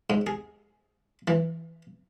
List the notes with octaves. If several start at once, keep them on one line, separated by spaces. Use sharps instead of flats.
G#2
G#4
E3